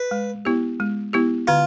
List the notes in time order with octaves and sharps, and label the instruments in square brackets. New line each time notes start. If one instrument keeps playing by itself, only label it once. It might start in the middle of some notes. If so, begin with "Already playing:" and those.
Already playing: [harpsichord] B4
[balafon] G#3
B3 E4 G4
G#3
B3 E4 G4
[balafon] D3 [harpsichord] F4